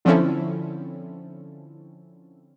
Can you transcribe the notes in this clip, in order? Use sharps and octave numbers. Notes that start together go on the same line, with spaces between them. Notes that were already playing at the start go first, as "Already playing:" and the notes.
D3 F3 C4 C#4 E4 A4